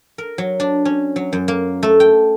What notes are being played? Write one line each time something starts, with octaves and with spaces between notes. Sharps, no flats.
A#4
F#3
D4
C#4
F#3
F#2
A#3
A3
G5